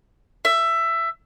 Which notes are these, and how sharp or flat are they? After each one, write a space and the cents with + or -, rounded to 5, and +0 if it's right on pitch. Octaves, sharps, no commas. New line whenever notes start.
E5 +15